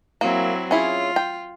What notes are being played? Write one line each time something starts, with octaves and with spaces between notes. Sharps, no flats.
F#3 A#3 C4 E4
C#4 E4 F4 G#4
G5